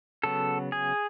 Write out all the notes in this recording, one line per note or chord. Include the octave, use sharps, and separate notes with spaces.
C#3 F#3 B3 A4
G#4